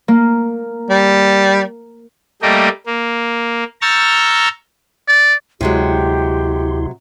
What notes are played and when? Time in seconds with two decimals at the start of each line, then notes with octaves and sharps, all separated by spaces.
0.08 A#3
0.90 G3
2.42 G3 A3 A#3 D#5 G5
2.86 A#3
3.82 A#5 C#6 E6 F6 G6 A6
5.08 D5
5.61 D2 C3 F#3 G#3 E4 G4 C6